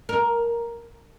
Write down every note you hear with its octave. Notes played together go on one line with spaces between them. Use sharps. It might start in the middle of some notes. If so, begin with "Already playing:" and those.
A#4